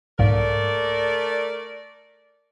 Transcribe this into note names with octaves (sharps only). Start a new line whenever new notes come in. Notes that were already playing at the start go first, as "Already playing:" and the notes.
C2 G#2 A3 A#3 A#4 D5